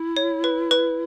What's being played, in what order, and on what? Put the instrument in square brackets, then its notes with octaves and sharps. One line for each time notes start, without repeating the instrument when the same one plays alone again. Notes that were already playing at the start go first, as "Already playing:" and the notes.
Already playing: [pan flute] E4
[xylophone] C#5
B4
B4